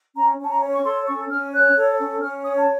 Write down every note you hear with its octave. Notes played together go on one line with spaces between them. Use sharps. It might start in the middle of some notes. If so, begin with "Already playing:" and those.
C#4 A#5
C#4 A5
A#5
C#5
C#6
A4 C6
C#4 C#6
C#4 F6
C#5 F#6
A4
C#4
C#4 F6
C#5 D#6
A5